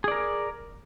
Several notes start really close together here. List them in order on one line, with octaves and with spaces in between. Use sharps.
G#4 D5 A#4